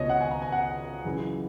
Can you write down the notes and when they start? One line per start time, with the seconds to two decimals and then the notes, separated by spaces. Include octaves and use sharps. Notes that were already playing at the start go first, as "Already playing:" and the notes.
Already playing: C#2 B2 C#5 D#5
0.09 F#5
0.20 G#5
0.31 A#5
0.42 G#5
0.52 F#5
1.05 F#2 C#3 E3